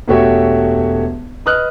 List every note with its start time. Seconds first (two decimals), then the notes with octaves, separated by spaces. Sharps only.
0.08 E1 A3 F#4 G4 C#5 E5
1.46 B4 D#5 D#6 F6 F#6